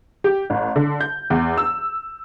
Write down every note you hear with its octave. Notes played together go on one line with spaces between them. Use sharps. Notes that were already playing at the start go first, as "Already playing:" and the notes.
G4
A1
D3
G6
E2
E6